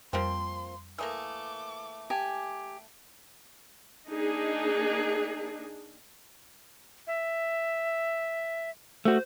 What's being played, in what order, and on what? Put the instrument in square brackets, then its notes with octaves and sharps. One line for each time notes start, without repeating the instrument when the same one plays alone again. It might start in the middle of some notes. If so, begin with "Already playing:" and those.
[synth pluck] F2 G3 [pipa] F3 A#3 C4 [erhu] C6
[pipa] E3 A3 A#3 [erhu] D6 [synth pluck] D#6
[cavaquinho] G4 G#5 [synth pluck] A5
[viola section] A#3 D4 D#4 G#4
[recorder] E5
[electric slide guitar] A3 F#4 [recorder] C5